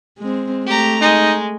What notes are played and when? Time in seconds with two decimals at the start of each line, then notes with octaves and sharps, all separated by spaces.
0.18 G#3 C4
0.67 A3 G4 A#5
1.01 G#3 D#4